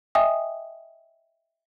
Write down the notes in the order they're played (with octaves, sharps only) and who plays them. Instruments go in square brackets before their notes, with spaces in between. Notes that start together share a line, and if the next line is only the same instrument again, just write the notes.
[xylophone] D#5 E5 G5 G#5 D#6